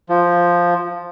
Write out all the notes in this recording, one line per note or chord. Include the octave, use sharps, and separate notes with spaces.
F3